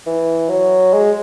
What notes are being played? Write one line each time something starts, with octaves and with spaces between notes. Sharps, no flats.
E3
F#3
G#3